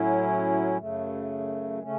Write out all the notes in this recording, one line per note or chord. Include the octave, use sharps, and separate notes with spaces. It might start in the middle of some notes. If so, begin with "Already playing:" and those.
Already playing: A2 F#3 C#4 E4
F#2 C#3 A3
C#3 A3 C#4